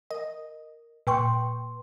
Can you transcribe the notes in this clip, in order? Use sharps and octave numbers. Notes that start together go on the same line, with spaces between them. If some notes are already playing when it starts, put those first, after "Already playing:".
A#4 D#5
A#2 B4 G5 C6 C#6